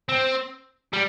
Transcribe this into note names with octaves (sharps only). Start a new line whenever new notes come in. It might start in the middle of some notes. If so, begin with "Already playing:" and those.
C4
G3